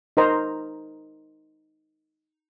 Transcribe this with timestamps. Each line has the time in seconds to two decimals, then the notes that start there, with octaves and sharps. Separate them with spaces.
0.17 D#4 A#4 C5 D#5 A#5